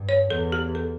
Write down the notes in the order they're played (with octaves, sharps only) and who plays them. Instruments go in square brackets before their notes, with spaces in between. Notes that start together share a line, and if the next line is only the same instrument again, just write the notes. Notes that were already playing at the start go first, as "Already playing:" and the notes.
Already playing: [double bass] G2
[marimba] C#5
[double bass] E2 [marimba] A4
[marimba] G4
A4